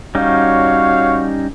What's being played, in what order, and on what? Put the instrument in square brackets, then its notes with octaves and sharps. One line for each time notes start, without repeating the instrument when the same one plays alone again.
[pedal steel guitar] G3 C#4 D#4 [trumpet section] F#4 C#5 F5